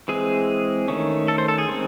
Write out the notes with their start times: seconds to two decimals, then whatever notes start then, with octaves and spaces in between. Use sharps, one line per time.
0.08 E3 G#3 C4 G#4
0.88 D#3 A3 C#4
1.28 A4
1.38 C5
1.48 A4
1.58 G#4
1.68 D#3 G#3 C4